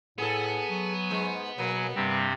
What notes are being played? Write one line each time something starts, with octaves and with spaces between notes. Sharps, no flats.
A2 B3 G#4 A4 G#5
F#3
G#2 G#3
B2 F#3 A#3 G#5
G2 C3 G3 C4